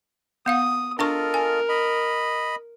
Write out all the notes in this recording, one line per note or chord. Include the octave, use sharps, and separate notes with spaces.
B3 F5 F#5 D#6
D4 F4 A4 A#4 D#5 A5 C#6
G#5
D#5 B5